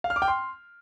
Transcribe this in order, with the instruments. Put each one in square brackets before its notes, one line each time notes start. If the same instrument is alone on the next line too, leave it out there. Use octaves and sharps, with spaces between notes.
[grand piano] F5
F6
D6
G5
C6